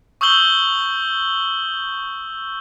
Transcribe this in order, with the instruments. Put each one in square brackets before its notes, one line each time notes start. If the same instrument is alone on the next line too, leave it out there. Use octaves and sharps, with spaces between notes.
[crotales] C#6 D#6 E6 G6 F#7 G7